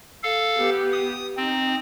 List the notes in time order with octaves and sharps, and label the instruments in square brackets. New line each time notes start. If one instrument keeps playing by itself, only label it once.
[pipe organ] A4 F5
[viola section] B3 G4
[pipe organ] D#6
[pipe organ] C4 [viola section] D#4